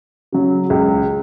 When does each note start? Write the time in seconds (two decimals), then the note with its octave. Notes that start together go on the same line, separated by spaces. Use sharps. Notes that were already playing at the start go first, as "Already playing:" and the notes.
0.32 C#3 F#3
0.70 C#2